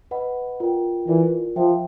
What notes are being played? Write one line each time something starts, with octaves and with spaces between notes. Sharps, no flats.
B4 D#5 F#5 B5
F4 A#4 D5 G5
E3 F4 A#4 D5
F3 C5 E5 G5